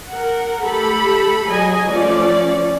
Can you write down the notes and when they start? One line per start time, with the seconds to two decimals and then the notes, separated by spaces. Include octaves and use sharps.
0.11 A#4 F#5
0.64 A3 G4 A4 B5
1.49 F#3 G#4 D#5 G#5
1.90 F3 A3 C#4 D5